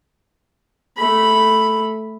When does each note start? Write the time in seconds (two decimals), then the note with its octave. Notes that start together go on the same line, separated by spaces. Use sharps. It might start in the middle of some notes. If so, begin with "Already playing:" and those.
0.97 A3 B5